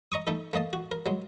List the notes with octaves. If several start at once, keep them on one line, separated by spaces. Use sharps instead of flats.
D#5 A#5 C#6 D#6
A3 D#4 A4
A3 A#3 D#5 A5
F#4
A#4
F#3 G#3